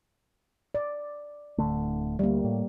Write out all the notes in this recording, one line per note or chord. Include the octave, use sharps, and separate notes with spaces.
D5
D1 D3 A3
D2 G3 A#3
A2